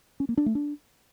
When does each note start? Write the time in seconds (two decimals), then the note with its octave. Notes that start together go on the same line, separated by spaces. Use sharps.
0.20 C#4
0.29 A#3
0.37 D4
0.46 A3
0.55 D4